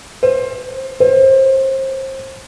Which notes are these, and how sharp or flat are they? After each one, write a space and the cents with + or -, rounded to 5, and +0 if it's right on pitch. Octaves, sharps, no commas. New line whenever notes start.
C5 +20
C5 +30